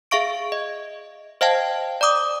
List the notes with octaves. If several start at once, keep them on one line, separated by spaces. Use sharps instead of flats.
G#4 E5 F5 C#6 D7
D#5
C5 D#5 F5 G5 A5
D5 A#5 D6 D#6